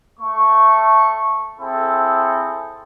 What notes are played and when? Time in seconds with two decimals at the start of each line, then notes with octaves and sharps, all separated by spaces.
0.20 A3 C#6
1.58 C4 E4 G#4 A4